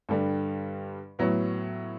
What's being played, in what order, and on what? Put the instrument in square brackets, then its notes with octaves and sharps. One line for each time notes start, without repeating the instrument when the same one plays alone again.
[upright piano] G2 D3 G3
A2 F#3 B3